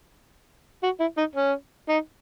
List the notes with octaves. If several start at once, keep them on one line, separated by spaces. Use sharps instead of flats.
F#4
E4
D#4
C#4
D#4